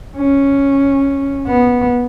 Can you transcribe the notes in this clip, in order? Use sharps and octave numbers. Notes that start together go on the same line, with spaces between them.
C#4
B3